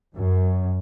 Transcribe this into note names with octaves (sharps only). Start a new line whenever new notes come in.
F#2